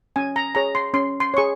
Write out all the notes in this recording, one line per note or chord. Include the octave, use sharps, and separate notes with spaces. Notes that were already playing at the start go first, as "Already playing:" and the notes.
C#4 G#5
A#5
G#4 C#5 A#5
C6
C#4 C6
C6
G#4 C#5 C#6